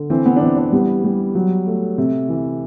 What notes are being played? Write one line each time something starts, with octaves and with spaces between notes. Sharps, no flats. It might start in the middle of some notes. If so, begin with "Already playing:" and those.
Already playing: D3
E3 C4
B3
D4
E3 C4
D4
G3 B3
G3
F#3
A3
C3
E3